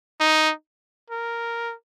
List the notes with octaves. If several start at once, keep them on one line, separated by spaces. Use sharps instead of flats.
D#4
A#4